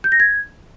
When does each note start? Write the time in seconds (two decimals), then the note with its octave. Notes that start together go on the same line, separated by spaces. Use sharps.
0.04 G6
0.12 A#6
0.20 G#6